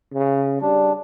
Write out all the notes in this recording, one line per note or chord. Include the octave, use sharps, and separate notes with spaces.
C#3
G3 D4